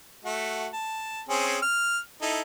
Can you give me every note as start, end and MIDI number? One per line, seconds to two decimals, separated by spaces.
0.25 0.68 57
0.25 0.68 66
0.73 1.21 81
1.29 1.58 60
1.29 1.58 61
1.29 1.58 68
1.62 1.98 89
2.22 2.41 63
2.22 2.41 64
2.22 2.41 69